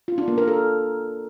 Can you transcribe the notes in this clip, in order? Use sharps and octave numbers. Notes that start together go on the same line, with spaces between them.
F4
D4
A#3
A#4
A4